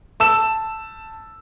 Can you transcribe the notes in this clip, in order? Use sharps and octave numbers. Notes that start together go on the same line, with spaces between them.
A5 E6 E7